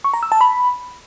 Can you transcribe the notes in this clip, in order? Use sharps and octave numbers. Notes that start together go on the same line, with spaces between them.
C#6
A#5
E6
A5
B5